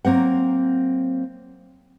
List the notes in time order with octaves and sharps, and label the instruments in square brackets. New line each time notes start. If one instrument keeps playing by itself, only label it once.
[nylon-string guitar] F#3 A#3 C4 F#5